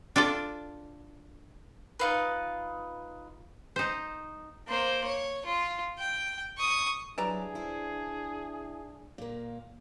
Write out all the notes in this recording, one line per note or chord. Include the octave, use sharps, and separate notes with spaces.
D4 F4 A4 D5
D#4 F4 B4
D#4 C5
A#3 C5
C#5
F4
G5
C#6 D#6
E3 F#3 D4 G4 G#4 D5 A#5
E4 C5
A#2 A#3